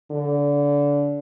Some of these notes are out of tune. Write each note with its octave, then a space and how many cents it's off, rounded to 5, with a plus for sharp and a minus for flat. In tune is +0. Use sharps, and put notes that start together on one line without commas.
D3 -25